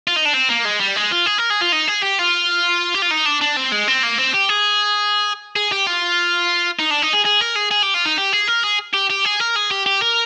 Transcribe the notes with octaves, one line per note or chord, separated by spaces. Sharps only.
F4
D#4
D4
C4
A#3
G#3
G3
G#3
F4
G#4
A#4
G#4
F4
D#4
G#4
G4
F4
G4
F4
D#4
D4
D4
C4
G#3
C4
A#3
C4
G4
G#4
G#4
G4
F4
D#4
D4
D#4
G#4
G#4
A#4
G#4
G#4
G4
F4
D#4
G4
G#4
A#4
G#4
G4
G4
G#4
A#4
G#4
G4
G4
A#4